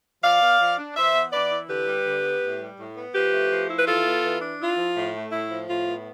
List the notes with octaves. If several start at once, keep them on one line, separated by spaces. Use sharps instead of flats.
F3 D5 F5
B3
F3
D4
E3 C5 E5
B3
E3 B4 D5
E4
D3 G4 B4
G3
D3
B3
A2
G3
A2
B3
F3 G4 B4
A3
F3
E4
B4
E3 F4 A4
B3
E3
D4
E4 F4
F3
A2
A3
A2 E4
F3
A2 F4
B3